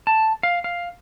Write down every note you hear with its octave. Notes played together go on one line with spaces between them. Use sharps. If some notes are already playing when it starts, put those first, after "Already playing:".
A5
F5
F5